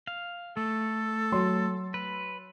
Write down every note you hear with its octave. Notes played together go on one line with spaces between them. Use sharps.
F5
A3 A4
F#3 C6
B4